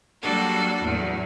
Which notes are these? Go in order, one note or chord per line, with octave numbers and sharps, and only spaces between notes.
F#3 G3 A#3 D4 F#4 A4
E2 A2 F#3